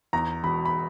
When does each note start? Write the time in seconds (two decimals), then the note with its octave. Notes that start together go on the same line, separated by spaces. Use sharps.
0.13 E2 A#5
0.43 E1 B5
0.65 B5